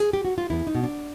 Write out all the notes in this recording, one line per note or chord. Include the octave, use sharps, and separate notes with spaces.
G#4
G4
F#4
F4
E2 E4
D#4
B2
D4